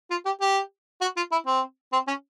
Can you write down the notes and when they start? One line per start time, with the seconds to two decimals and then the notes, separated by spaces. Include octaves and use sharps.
0.10 F4
0.25 G4
0.41 G4
1.01 F#4
1.17 F4
1.32 E4
1.46 C4
1.92 C4
2.07 C#4